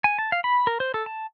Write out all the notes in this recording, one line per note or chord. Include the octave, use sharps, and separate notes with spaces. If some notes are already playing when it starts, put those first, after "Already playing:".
G#5
A5
F5
B5
A#4
C5
A4
A5